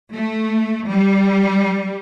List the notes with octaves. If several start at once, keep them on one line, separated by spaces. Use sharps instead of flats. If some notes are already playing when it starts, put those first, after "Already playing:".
A3
G3